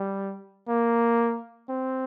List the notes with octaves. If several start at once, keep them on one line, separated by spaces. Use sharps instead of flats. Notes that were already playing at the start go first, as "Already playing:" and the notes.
Already playing: G3
A#3
C4